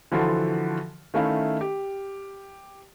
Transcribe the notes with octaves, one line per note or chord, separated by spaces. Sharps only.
D3 E3 F3 F4 F#4 A4
D#3 A3 C#4 E4 F5
G4